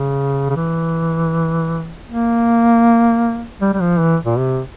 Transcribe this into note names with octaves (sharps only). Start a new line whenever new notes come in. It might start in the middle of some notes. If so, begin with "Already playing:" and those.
Already playing: C#3
C#3
E3
A#3
G3
G3
F3
E3
A#2
C3